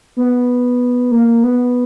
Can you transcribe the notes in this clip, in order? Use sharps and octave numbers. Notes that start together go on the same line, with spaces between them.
B3
A#3
B3